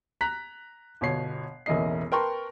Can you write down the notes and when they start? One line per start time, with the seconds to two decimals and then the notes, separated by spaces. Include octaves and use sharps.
0.21 A#5 F#6 B6
1.01 G1 B2 C#5 C7
1.66 E1 A1 A#3 E4 D#5 C7
2.12 A#4 B4 G5 A5 C6 C#6